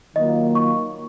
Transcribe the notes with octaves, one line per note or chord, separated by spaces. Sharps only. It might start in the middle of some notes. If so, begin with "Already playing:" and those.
D#3 F#3 A#3 F4 D#5
C#6